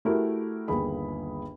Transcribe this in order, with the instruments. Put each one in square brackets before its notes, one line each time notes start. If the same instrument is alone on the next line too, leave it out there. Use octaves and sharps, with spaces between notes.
[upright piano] A3 E4 F#4 G4 A#4
G1 D#2 G#4 B5